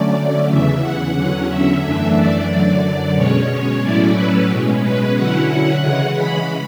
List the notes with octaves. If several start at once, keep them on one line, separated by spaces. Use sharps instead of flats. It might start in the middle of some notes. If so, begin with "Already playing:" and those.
Already playing: D3 F#3 A3 C#4 D5
E2 C#3 E3 E5
F#5
E2 D3 F#3 C#4
E5
F#2 E3 A3 D4 E5
D5
F#2 D3 F#3
D5
B2 G#3 C#4 C#5
C#5
A2 F#3 A3 C#4 E4 D5
B4
B2 G#3 C#4
B4
D3 F#3 C#4 E4 F#5
F#5
C#3 E3 G#3 C#4 F#5
B5